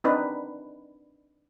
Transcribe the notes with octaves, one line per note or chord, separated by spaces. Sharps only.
C4 D4 D#4 B4